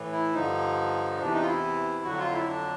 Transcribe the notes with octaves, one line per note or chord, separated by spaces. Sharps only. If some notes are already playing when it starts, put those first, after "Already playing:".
Already playing: A2 E3
E4
G2 D3 F3 D#4
E2 C3 E3 D4
D#4
F4
E4
F2 D3 F#3 F#4
F4
E4
D4